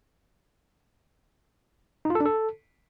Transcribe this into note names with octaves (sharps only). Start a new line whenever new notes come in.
D#4
F4
A4
D4
A4